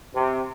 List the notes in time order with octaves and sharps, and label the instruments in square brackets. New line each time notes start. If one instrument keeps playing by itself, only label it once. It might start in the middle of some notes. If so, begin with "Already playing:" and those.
[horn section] C3